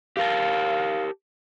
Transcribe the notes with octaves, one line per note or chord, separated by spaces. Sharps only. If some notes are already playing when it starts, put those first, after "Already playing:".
G4 A#4 F5 A5